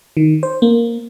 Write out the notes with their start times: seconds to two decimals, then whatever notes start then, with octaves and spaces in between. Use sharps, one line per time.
0.17 D#3
0.43 C5
0.62 A#3